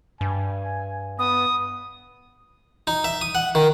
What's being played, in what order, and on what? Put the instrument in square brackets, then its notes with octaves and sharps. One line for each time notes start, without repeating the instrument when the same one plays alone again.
[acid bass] G2 [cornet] G#5
[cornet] B3 [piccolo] D#6
[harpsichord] D#4
E5
D#6
F#5
D#3